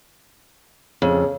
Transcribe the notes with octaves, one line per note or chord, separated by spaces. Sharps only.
F2 C#3